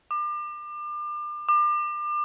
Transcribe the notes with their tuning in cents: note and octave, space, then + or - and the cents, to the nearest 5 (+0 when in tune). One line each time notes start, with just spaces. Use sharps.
D6 +35
D6 +35